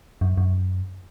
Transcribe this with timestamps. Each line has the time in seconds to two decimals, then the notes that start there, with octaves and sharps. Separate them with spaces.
0.21 F#2
0.37 F#2